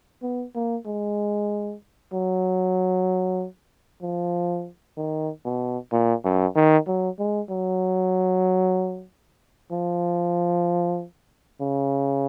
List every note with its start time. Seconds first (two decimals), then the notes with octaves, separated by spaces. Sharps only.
0.23 B3
0.55 A#3
0.86 G#3
2.13 F#3
4.02 F3
4.97 D#3
5.45 B2
5.92 A#2
6.25 F#2
6.56 D#3
6.87 F#3
7.19 G#3
7.50 F#3
9.72 F3
11.61 C#3